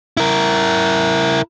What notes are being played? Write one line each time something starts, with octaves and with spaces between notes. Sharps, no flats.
E4 A#4